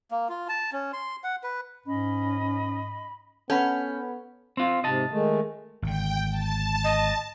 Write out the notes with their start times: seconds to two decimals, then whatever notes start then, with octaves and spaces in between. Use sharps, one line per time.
0.11 A#3
0.29 F4
0.49 A5
0.73 C#4
0.93 C6
1.24 F#5
1.43 B4
1.86 G#2 C#4 D#5 B5
3.50 B3 C#4 A4 B4 F#5 B5 G6
4.57 C4 F4
4.84 G#2 C3 D#5 A5
5.11 D#3 G#3 A3
5.82 G#1 D3 G5
6.29 A5
6.84 D#5